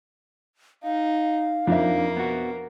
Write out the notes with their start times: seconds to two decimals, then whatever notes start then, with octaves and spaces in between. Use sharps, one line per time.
0.83 D#4 F5
1.67 F2 A#3 D4 D#4 E5
2.17 B3 F#4